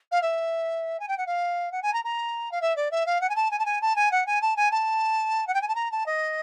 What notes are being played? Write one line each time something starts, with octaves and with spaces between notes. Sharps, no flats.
F5
E5
G#5
G5
F#5
F5
F#5
G#5
A#5
A#5
F5
E5
D5
E5
F5
F#5
G#5
A5
G#5
A5
G#5
A5
G#5
F#5
G#5
A5
G#5
A5
F#5
G5
G#5
A5
A#5
A5
D#5